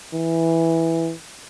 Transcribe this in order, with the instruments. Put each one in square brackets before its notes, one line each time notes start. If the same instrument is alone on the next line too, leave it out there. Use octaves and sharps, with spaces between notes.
[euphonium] E3